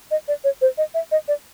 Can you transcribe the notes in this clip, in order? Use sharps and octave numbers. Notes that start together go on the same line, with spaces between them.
D#5
D5
C#5
C5
D#5
E5
D#5
D5